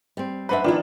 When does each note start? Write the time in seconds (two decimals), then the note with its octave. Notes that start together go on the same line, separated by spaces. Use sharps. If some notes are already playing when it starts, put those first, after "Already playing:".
0.17 G3 C4
0.49 F#2 D4 B4 C5 E5 F#5
0.64 D#3 F3 B3 D4 E4